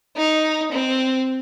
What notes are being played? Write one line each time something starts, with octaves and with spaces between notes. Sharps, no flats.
D#4
C4